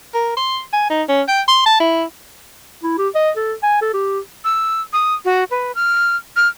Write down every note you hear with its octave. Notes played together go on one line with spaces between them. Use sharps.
A#4
C6
G#5
D#4
C#4
G5
C6
A5
E4
E4
G4
D#5
A4
G#5
A4
G4
E6
D#6
F#4
B4
F6
F6